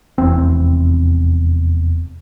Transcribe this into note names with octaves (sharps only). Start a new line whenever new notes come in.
F1 E2 C4